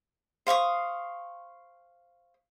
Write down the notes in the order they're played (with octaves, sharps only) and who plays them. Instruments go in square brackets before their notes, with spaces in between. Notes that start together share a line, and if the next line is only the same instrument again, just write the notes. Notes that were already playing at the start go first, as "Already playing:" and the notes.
[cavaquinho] C5 F5 C#6 D#6